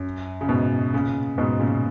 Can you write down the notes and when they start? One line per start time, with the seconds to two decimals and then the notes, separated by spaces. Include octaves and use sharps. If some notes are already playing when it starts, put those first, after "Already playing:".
Already playing: F#2
0.41 C#3
0.49 G#2 B2
0.93 A#2 C#3
1.38 G#2 B2
1.60 A#2 C#3